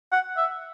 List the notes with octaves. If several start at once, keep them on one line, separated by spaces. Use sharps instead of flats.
F#5
E5